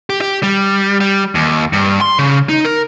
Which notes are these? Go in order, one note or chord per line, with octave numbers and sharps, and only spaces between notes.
G4
G4
G3
G3
D#2
G2
C6
C#3
D#4
A#4